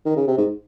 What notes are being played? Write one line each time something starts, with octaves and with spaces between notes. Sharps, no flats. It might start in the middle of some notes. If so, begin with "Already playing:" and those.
D#3
C#3
C3
G#2